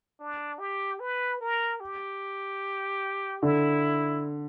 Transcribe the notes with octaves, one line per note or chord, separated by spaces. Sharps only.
D4
G4
B4
A#4
G4
D3 E4